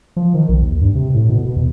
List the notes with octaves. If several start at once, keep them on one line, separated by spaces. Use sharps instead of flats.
F3
D#3
B1
D#2
G2
C3
A2
B2
B2
E2